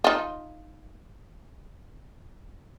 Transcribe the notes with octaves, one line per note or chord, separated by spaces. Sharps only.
D#4 F4